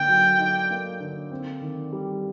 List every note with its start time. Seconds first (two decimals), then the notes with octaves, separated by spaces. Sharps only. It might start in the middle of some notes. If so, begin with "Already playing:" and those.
Already playing: D3 A#3 G5
0.08 F#3
0.39 D#4
0.70 A#3
1.00 D3
1.31 C4
1.61 D#3
1.92 G3